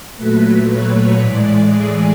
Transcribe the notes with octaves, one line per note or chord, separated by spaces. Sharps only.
A#2 F#3 A3 B4
C#5
A2 E3 G#3 D5
G#4